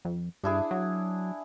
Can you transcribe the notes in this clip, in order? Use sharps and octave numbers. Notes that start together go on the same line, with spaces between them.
F2
G2 D4 E4 G#4
F#3